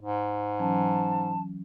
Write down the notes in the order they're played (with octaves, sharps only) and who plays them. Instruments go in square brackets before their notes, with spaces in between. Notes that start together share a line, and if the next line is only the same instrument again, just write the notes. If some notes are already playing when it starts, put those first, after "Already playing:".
[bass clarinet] G#2
[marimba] E3 F#3 C#4 [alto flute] A5